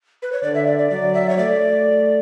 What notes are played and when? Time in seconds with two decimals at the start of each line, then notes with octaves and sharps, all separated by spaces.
0.22 B4
0.33 C#5
0.43 D3 D5
0.55 E5
0.67 D5
0.78 D5
0.90 F#3 D5
1.14 E5
1.30 C#5
1.38 A3 D5